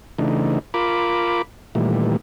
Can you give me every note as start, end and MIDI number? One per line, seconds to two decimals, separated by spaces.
0.19 0.59 49
0.19 0.59 52
0.19 0.59 57
0.19 0.59 62
0.19 0.59 63
0.74 1.42 65
0.74 1.42 70
0.74 1.42 83
0.74 1.42 86
1.75 2.17 46
1.75 2.17 51
1.75 2.17 52
1.75 2.17 55
1.75 2.17 57